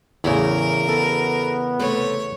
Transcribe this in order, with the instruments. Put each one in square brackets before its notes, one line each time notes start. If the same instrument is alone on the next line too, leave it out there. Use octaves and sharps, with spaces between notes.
[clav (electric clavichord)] E2 C#3 [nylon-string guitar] A2 E4 [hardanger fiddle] A#4
[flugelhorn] B3 [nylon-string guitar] F#4 A4
[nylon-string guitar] C3 A3 B4 [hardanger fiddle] C#5